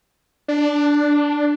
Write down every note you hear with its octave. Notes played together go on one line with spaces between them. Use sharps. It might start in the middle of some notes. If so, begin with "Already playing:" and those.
D4